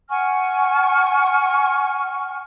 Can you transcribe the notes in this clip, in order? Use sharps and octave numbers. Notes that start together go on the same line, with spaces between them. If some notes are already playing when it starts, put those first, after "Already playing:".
F#5 G#5 C#6 F6